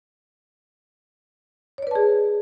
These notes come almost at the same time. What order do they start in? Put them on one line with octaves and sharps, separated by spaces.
C#5 D5 B4 A5 G#4